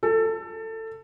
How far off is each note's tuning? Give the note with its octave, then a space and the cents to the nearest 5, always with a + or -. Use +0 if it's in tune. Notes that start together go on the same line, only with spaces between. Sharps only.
A4 +20